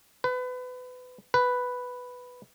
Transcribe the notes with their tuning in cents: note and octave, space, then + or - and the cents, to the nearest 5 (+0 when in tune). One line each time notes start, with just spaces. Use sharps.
B4 +25
B4 +0